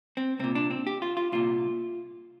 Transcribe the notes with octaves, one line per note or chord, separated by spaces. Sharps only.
C4
C2 A#2 C4
D4
C4
G4
F4
F4
C2 A#2 F4